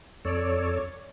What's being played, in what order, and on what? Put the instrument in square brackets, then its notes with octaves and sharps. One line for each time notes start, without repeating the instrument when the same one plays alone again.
[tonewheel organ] F2 A4 [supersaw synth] C#5 D5